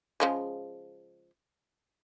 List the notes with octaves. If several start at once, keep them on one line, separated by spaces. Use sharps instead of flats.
C#3 F3 G#3